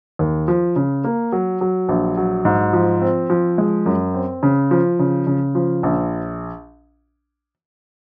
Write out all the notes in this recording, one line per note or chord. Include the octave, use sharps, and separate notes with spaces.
D#2
F3
C#3
A#3
F#3
F#3
A#1
F#3
G#2
F3
C4
F3
G#3
F#2
C4
C#3
F3
C#3
C#3
F3
A#1